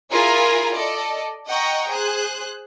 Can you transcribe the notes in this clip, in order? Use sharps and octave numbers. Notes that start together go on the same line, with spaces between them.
E4 F4 G#4 A#4 G#5 A#5
A4 D5 D#5
D#5 F#5 G5 A#5 C#6
G#4 C5 F#6